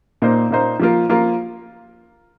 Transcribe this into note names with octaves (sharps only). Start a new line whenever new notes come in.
A#2 A#3 D#4 C5
A#2 A#3 D#4 C5
F3 A#3 F4 A#4
F3 A#3 F4 A#4